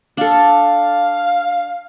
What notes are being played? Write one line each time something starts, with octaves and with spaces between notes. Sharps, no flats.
D4 A4 F5